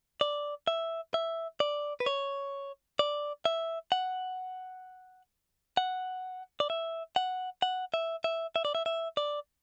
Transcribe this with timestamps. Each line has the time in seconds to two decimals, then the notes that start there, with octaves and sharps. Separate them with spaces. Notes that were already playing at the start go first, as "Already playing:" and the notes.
0.21 D5
0.67 E5
1.14 E5
1.60 D5
2.00 B4
2.06 C#5
2.99 D5
3.45 E5
3.92 F#5
5.77 F#5
6.60 D5
6.70 E5
7.16 F#5
7.62 F#5
7.94 E5
8.24 E5
8.56 E5
8.65 D5
8.75 E5
8.86 E5
9.17 D5